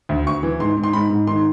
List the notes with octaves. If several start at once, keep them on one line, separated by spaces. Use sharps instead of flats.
D2
D2 C#6
E3
G#2 C6
G#2
C6
G#2 B5
G#2
D#3 C6